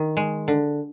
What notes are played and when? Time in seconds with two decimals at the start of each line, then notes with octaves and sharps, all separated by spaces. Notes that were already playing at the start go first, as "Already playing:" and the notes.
Already playing: D#3
0.17 G#3
0.48 D3